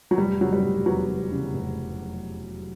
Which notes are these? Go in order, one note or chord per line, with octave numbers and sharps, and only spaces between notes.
F#3
F1 G3
C#3 F#3
G3
F1
E2 F#3
F1
C#3
F1